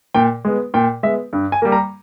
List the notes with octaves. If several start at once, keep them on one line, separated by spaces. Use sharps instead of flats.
A#2 G5
G#3 B3
A#2 G5
G#3 B3 E5
G2
G#5
G3 A#3
A#5